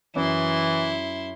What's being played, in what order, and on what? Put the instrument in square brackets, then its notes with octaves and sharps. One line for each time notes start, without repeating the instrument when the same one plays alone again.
[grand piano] F#2 [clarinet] E3 [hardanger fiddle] E4 C6